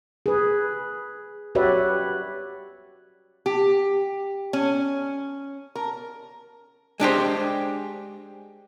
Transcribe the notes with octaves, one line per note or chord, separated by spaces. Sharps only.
G#4 B4
F#4 G4 B4 C#5 D5 E5
G4
C#4
A#4
G#3 D4 G4 C5